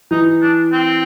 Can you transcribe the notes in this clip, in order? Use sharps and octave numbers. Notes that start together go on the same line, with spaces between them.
E3 D#4
D4
C4